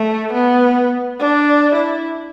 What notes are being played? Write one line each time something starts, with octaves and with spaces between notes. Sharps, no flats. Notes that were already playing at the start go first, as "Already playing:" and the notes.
Already playing: A3
B3
D4
E4